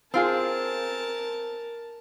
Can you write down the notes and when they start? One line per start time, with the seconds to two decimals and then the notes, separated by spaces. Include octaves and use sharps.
0.14 C4 F4 G#4 A#4 A5